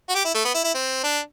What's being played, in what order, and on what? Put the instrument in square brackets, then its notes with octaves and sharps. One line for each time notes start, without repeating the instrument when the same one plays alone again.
[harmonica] F#4
G4
E4
A3
B3
E4
E4
C4
D4